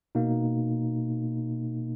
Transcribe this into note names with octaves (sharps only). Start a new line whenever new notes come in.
B2 A#3 D#4